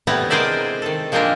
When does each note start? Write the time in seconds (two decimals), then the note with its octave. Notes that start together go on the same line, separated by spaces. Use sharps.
0.07 C3 G3 A3 B3 E4 A#5
0.30 G#3 G#4 A#4 C5 D5 E5
0.82 D#3 A4
1.12 F3 G#3 A#3 C4 D4 A#4